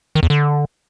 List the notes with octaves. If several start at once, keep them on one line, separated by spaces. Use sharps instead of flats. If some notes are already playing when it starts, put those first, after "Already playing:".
D#3
E2
D3